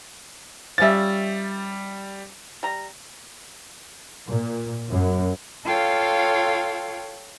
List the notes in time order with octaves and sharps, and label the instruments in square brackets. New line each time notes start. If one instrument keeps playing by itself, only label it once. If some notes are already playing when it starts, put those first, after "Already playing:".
[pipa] F3 C#4 E5 [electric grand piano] G3 A6
[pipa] G3 A#5
[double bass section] A#2
F#2
[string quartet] F4 A4 C#5 F5 G5